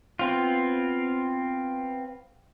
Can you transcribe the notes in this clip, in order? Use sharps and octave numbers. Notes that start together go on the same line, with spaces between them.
B3 C4 F4